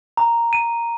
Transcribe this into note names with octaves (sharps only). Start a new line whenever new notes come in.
A#5
D#7